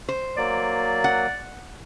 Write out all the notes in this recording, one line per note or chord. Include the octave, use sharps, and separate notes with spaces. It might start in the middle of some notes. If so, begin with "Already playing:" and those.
C5
F#3 A#3 D5
F#5